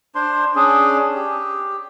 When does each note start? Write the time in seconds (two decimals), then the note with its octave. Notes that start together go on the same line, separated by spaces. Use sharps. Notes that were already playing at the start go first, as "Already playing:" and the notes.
0.15 D4 C5 C6
0.56 C#4 D4 G#4
1.14 G4